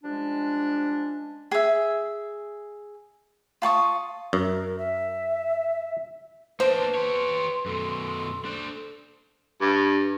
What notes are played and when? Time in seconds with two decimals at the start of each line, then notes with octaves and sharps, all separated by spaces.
0.04 F3 G3 G#3 C#4 D4
1.51 G#4 E5
3.62 F4 A5 C#6 D#6
4.33 F#2 A#4
4.78 E5
6.60 A#3 D4 B4 C5 A5
6.95 G4 C#5 C6
7.66 F#2 B2 A4
8.45 D4 C5
9.61 G2